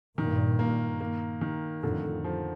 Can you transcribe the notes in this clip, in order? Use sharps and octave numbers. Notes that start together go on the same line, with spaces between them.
G2 A#2 D#3
A#3
A#3
D#3
F2 A2 D3
F3